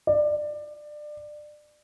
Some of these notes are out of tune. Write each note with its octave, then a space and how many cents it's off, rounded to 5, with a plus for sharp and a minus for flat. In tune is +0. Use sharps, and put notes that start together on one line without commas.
D5 +25